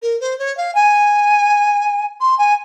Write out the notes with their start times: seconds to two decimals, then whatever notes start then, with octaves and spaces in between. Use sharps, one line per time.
0.02 A#4
0.20 C5
0.39 C#5
0.57 F5
0.75 G#5
2.20 C6
2.38 G#5